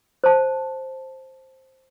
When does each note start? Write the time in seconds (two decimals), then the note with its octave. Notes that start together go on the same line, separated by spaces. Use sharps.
0.24 C5 A5